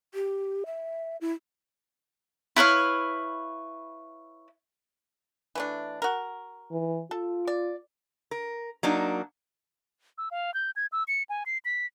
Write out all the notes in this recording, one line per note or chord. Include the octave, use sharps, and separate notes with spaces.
G4
E5
E4
E4 B4 C#5 F5
E3 A3 D4
F#4 A#4
E3
F4 A4
D5
A#4
F#3 A#3 D4 D#4
E6
F5
G6
G#6
E6
C#7
G#5
C7
B6